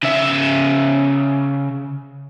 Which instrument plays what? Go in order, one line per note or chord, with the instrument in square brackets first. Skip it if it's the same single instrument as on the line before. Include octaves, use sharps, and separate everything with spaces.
[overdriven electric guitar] C#3 E5